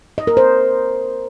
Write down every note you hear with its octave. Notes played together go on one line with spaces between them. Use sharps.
D#5
A#4
C5